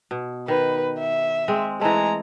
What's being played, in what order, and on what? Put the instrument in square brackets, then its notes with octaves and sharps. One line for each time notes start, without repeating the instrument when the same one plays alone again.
[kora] B2
[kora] D#3 [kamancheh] B4
[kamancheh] E5
[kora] G#3 C4
[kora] E3 A3 [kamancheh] G#3 A#5